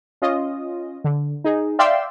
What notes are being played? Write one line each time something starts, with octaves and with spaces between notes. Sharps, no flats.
C#4 F4 D#5
D3
D#4 G#4
D5 E5 F5 G5 C6 E6